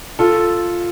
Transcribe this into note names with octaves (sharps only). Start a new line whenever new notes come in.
F4 A4